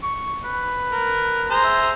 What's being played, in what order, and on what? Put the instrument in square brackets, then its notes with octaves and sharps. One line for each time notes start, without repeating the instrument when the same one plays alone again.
[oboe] C#6
B4
[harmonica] A#4
G#4 C5 A#5
[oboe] E5